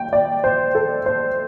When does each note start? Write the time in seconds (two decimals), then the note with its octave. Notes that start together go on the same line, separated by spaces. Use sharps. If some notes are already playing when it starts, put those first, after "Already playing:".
Already playing: G5
0.13 D5
0.44 C5
0.75 A4
1.06 C5